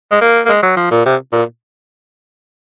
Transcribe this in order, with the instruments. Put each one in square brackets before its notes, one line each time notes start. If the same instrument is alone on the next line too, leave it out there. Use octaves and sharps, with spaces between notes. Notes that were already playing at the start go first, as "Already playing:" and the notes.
[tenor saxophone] G#3
A#3
A#3
G#3
F#3
F3
A#2
C3
A#2